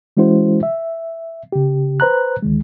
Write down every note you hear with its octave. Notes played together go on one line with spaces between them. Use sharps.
E3 G#3 C#4 E4 F#4 C5
E5
C#3 G4
B4 C5 A#5 F#6
D2 D#3 G#3